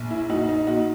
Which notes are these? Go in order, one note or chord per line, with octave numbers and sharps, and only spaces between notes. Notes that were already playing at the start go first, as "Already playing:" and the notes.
Already playing: A#1
E4
A#1 D#4 F#4
D#4
A#2 D#4 F#4